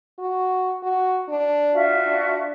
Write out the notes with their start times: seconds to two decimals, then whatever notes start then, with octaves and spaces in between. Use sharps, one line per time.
0.19 F#4
0.83 F#4
1.28 D4
1.72 F4 F#4 E5
2.06 D4